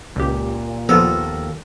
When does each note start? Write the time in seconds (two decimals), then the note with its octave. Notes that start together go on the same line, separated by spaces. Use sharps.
0.16 C#2 A#2 G4
0.89 D#2 F3 A#3 B3 F4 A4